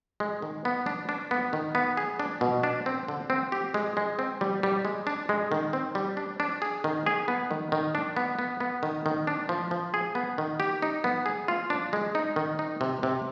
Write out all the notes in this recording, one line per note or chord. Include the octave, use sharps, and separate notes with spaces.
G#3
D#3
B3
D4
D4
B3
D#3
B3
G#4
D4
B2
D4
C4
D3
C4
G4
G#3
G#3
C4
G3
G3
G#3
D4
G#3
D#3
C4
G3
D4
D4
G#4
D#3
G#4
B3
D#3
D#3
D4
B3
B3
B3
D#3
D#3
D4
F3
F3
G#4
B3
D#3
G4
D#4
B3
G#4
F4
D4
G#3
D#4
D#3
D#4
C3
C3